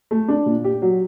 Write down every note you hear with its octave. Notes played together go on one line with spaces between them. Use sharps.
A3
D4
A#2
G4
F#3